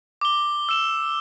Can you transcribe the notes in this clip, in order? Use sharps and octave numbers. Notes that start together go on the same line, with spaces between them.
D6 G7
E6 E7 G7